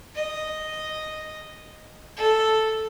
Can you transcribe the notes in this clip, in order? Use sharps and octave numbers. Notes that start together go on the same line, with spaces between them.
D#5
A4